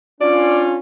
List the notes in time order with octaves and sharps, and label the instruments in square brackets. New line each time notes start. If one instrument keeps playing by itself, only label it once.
[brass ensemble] C#4 D4 F4 [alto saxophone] D5